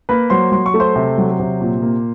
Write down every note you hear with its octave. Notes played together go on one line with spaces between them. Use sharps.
A#3 B4 B5
F#3 C5 C6
F#3 C6
C#6
A3
C5 C6
C3
F#3
C3
A#2
A#3